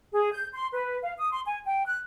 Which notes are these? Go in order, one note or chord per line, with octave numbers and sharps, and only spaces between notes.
G#4
G6
C6
B4
F5
D#6
C6
G#5
G5
F#6